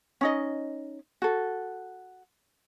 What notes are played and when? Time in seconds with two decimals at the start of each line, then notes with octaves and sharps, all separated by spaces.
0.21 C#4 D#4 D#5
1.22 F#4 A4